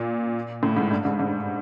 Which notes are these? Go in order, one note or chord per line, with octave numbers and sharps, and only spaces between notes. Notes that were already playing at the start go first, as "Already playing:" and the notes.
Already playing: A#2
A2
G#2
G2
G#2
G#2
G2